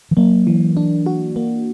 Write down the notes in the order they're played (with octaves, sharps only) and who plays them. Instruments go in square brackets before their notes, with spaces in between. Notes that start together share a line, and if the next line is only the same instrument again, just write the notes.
[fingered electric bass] E3
[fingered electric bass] F#3 [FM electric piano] A#3
[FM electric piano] E3
D4
F#4
A#3